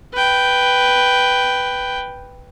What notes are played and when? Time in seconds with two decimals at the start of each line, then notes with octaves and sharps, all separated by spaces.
0.13 B4 G5